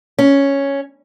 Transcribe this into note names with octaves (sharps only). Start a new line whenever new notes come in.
C#4